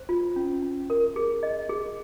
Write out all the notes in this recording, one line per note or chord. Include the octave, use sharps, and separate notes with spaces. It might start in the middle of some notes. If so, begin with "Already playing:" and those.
Already playing: C5
F4
C#4
C#4
A#4
G#4
D#5
G#4